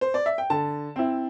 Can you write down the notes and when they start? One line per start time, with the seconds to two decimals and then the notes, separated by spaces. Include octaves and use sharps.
0.01 C5
0.14 D5
0.26 E5
0.38 G5
0.50 D3 A5
0.96 C4 E4